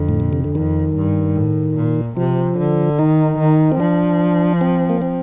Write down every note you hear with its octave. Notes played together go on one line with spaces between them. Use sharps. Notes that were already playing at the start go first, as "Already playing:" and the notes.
Already playing: F2 D3
A2
A#2
C3
D3
F2 D#3
G2
A2
A#2
C3 F3
D3
D#3 D#4
D#3
C4
F3 D4
C4
A#3
C4